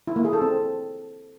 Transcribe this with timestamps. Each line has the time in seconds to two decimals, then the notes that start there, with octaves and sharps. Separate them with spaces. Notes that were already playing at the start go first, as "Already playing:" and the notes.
0.07 E4
0.16 A#3
0.25 G#4
0.33 A4
0.42 C4